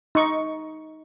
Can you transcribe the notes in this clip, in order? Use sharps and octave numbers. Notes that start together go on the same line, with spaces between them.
D#4 C#6